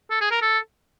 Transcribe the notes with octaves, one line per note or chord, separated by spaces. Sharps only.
A4
G#4
A#4
A4